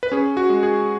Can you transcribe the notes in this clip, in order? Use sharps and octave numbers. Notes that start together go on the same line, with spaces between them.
B4
C#4 G#4
F#4
G#3
G#4